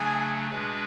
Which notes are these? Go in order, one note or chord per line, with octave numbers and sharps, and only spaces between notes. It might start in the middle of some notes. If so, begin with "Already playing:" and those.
Already playing: C#3 F#3 A3 D4 G#4 G#5
B2 G#3 D4 G#4 B4